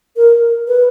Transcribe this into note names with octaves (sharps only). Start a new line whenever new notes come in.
A#4
B4